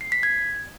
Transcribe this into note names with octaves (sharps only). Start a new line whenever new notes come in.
C7
B6
G#6